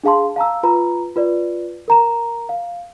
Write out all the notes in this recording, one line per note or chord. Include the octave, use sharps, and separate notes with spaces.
D4 G#4 F5 A5 C6
F5 A5 A#5 E6
F4 B4 A#5 B5
F4 B4 D5
A#4 A#5 E7
F5